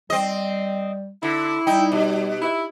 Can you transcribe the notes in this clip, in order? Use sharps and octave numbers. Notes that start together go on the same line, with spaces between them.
G3 C4 D#5
D3 E4
G3 D#4 G5
B2 G4
E4